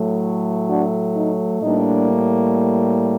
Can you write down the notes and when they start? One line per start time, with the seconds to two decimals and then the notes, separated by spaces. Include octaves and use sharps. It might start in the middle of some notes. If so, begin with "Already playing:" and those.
Already playing: A2 F#3 A3
0.69 D4 F#4
1.16 D#4
1.62 A2 G3 A#3 D4 D#4